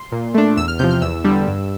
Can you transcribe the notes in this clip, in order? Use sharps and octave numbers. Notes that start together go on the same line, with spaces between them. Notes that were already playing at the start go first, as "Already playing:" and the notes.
Already playing: C6
A#2
A3 D4
E2 E6
F6
C3 F3 G6
F6
E2 E6
D3 G3
G2